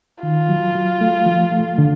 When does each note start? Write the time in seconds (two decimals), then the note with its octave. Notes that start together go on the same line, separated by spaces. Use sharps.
0.23 D#3 F4
0.49 F#3
0.75 F#3
1.01 A3
1.26 F3
1.52 A3
1.78 D3